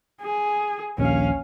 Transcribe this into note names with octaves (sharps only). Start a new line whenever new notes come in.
G#4
A#1 D#2 C#4 F5